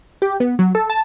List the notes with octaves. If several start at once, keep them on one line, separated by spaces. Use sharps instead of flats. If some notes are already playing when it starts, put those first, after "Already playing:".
G4
B3
F#3
A4
A5